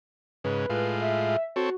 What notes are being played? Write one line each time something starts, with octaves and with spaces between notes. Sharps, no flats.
G#2 C#3 B4
A2 G#3 F4
E5
C4 F#4 A4 C#5